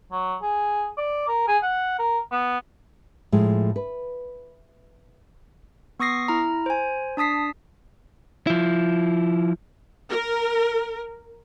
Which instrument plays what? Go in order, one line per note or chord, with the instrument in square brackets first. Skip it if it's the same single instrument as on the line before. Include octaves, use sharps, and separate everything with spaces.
[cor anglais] F#3
G#4
D5
A#4
G#4
F#5
A#4
B3
[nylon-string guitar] A2 F3 G#3 G#4
B4
[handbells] B3 C#6 D#6 A#6 C7
E4 A#5
C5 G#5
D4 A5 D#6 B6 C7
[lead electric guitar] F3 E4
[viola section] A#4